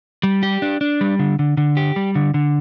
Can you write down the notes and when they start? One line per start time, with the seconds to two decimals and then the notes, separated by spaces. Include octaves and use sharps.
0.23 G3
0.43 G4
0.62 D4
0.81 D4
1.01 G3
1.19 D3
1.39 D3
1.57 D3
1.77 G4
1.96 G3
2.15 D3
2.34 D3